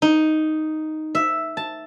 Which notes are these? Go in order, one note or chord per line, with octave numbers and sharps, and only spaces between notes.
D#4
E5
A5